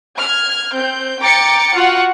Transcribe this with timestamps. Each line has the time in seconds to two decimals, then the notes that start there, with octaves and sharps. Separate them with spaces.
0.16 F6 G#6
0.72 C4 G6
1.20 G5 A#5 D6 A6 C#7
1.75 F4 F#4 F#5